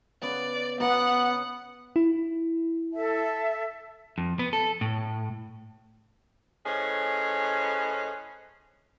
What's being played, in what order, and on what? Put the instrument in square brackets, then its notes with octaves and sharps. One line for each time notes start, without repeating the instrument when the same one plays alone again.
[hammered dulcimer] C#3 B3 F#5 [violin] D5
[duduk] B3 [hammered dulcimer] B4 E5 A#5 [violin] F#5
[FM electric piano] E4
[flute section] A4 E5 A5
[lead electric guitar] F2
B3
A4
A2
[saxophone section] A2 C#4 G#4 B4 C5 D#5